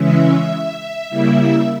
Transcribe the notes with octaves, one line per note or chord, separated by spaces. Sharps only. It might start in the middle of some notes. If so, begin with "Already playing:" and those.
Already playing: C#3 E3 G#3 C#4 E5
C#3 G3 A#3 E4